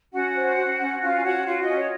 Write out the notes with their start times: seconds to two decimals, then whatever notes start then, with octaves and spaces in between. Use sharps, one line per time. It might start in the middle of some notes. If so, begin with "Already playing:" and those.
0.12 C#4 F#4 F#5
0.35 C5
0.57 F#4
0.79 C#4
1.01 C#4 F4 F5
1.14 G#5
1.23 F#4 C#5 F#5
1.45 F4 F#4 F5
1.61 D#5
1.68 C#4
1.75 C#5